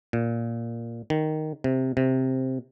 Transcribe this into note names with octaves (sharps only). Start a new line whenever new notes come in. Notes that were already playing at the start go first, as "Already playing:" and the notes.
A#2
D#3
C3
C3